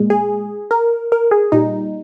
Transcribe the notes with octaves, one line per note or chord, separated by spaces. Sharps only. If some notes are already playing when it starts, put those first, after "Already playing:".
Already playing: A#2 G#3
G#4
A#4
A#4
G#4
A#2 G3 D#4